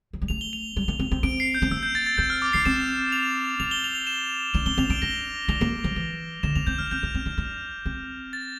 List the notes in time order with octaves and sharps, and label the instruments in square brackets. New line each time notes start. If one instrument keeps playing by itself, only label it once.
[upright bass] F3
G3
[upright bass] A3 [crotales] F7
[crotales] G7
F7
[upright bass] G3
A#3
C4
C4
[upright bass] C4 [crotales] D7
[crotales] C7
G6
[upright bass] C4
[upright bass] A#3 [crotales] E6
[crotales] G6
A6
A6
[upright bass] C4 [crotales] G6
[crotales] F6
D6
[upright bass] D4 [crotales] C7
[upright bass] C4 [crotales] E7
[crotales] F7
[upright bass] C4 [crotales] F7
[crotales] G7
F7
F7
E7
[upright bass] D4 [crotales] E7
[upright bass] C4 [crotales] G7
[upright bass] C4 [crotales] F7
[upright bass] D4 [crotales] D7
[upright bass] D4 [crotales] A#6
[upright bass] D4 [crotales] F7
[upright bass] A#3
F3
E3
[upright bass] D3 [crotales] E7
[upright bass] C4 [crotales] F7
[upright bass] C4 [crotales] G6
[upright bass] D4 [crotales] F6
[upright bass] C4 [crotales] G6
[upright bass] D4
C4
D4
D4
C4
[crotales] A6